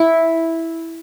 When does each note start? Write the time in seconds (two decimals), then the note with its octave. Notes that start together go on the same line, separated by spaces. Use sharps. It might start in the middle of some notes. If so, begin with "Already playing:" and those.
Already playing: E4